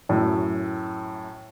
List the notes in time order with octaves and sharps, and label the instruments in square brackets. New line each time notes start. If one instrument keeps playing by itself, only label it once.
[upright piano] F#2 A2